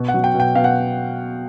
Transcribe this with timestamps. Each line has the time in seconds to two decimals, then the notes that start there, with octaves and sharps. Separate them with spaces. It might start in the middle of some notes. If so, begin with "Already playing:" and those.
Already playing: B2
0.08 F#5
0.14 F#3
0.24 G5
0.34 B2
0.40 G5
0.55 B2 F5
0.64 F#5